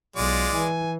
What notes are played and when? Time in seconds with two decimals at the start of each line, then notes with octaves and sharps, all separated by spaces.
0.16 B1 G#3 F4 D5
0.53 E3 G#5